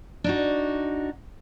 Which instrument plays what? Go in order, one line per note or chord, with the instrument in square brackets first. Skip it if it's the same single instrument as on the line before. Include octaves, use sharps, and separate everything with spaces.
[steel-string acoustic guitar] D4 D#4 F#4